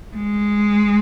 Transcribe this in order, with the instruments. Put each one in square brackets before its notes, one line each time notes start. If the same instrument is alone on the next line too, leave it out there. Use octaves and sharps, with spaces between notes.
[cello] G#3